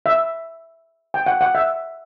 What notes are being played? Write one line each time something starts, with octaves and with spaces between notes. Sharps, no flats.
E5
G5
F#5
F#5
E5